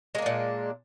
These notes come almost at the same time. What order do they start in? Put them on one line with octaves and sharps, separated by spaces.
G#3 A#3 D4 A#2